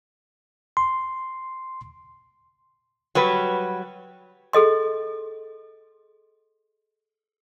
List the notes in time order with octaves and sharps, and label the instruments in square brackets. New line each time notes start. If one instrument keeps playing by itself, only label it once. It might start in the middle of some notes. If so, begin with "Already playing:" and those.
[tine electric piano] C6
[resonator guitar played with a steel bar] F#3 G3 B4
[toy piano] G#4 A4 D#5 C6